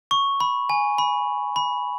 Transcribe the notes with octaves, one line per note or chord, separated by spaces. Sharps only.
C#6
B5
G#5
B5
B5